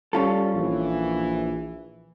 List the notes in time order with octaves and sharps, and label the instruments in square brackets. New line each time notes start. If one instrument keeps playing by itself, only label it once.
[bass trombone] G3 [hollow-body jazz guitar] C#4 F4 A4
[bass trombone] A#1 [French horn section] E3